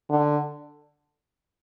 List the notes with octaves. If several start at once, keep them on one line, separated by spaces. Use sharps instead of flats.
D3